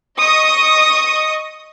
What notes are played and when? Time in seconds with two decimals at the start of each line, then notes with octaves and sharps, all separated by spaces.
0.21 D#5 C#6 D#6